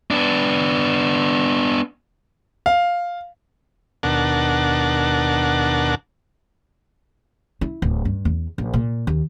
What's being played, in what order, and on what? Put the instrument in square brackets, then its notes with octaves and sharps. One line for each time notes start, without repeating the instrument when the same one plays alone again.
[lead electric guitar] B3 D4
[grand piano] F5
[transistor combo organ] D#2 B2 D4 A#4 F#5 A5
[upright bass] E4
D1
G2
E2
A#1
A#2
D#2